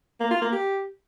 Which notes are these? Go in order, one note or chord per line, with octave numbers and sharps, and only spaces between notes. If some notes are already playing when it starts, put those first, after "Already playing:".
A#3
F4
A#3
G4